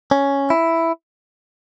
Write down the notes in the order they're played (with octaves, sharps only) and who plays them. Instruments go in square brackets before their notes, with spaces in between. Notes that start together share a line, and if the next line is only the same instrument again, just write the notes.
[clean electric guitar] C#4
E4